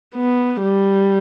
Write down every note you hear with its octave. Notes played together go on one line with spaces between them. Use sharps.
B3
G3